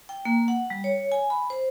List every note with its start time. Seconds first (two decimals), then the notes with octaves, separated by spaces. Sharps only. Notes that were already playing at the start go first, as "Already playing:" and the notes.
0.09 G5
0.25 A#3
0.48 F#5
0.70 G3
0.84 C#5
1.12 G#5
1.30 B5
1.50 C5